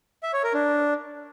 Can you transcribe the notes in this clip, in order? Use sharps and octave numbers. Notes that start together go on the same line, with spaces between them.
E5
C#5
A#4
D4